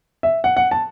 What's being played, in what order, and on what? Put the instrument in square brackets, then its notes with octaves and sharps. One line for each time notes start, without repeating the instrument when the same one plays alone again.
[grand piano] E5
F#5
F#5
A5